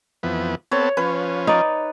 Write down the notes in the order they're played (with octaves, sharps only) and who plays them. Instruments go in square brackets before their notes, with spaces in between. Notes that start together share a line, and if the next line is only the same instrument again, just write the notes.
[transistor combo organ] F2 E3 B3
[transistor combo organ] B3 C4 A4 [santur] C#5
[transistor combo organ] F3 C#4 [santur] B4
[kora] D#4 D5